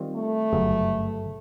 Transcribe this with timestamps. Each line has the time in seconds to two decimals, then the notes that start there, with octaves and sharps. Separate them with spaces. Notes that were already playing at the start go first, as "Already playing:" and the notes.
Already playing: D#3 G3 C4 F4
0.15 A3
0.53 G1 F#2 C#3